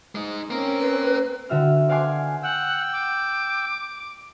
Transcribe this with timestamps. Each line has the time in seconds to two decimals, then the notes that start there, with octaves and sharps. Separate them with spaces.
0.15 G#3 D#4
0.50 A#3 C4 C#4 A#4
0.80 B4
1.49 D3 F#4 E5 F6
1.89 D5 F5 F#5 G#5 C6 D6
2.43 F#5 G5 E6
2.92 D6